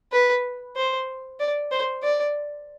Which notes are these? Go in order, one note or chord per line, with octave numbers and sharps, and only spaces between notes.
B4
C5
D5
C5
D5